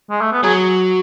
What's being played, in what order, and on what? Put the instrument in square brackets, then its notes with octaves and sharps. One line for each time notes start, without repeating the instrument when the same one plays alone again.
[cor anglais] G#3
A3
B3
[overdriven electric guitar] F#3 [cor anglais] G#4